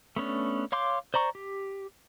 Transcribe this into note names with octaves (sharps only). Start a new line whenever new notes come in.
A3 B3 C#4 D4
C#5 F5 C6 D6 G6
C5 D5 A#5 C#6
G4